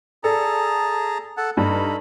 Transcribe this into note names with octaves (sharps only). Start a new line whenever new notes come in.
G#4 A4 D5 A5 A#5
A4 F#5 A5
G2 D#4 A4 B5